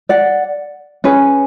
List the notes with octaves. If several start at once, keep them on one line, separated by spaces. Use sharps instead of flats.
D5 F#5
C#4 G#4 B4